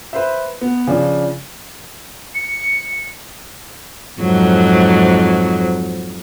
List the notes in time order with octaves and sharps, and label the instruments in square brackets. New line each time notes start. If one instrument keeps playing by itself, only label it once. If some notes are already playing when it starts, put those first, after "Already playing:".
[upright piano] B4 C5 E5
B3
C#3 F3 D4
[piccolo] C#7
[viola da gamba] F2 G#2 F#3